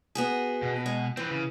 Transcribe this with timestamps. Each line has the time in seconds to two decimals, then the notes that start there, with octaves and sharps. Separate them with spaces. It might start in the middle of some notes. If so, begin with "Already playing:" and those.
0.15 B3 F#4 G#4
0.62 B2
0.86 G#3
1.17 E3 C4 B4
1.30 C#3